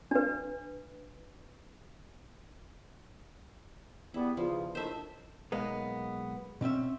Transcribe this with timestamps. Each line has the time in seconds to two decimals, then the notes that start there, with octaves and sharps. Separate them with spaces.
0.11 D4 B4
4.14 E2 G3 B3 E4
4.37 E2 G2 C#3 F3
4.75 A2 D#3 D4 C5 E5
5.52 B1 G#3 A#3 B3
6.61 B2 C4 C#4 E5